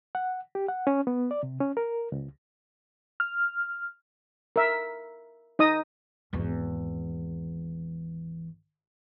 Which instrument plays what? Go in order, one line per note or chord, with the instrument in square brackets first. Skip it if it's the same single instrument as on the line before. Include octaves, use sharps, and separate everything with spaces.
[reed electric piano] F#5
G4
F#5
C#4
B3
D5
C3
C#4
A#4
C#2
[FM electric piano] F6
[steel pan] A#4 E5
D#4 D#5 D#6
[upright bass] G#1 E2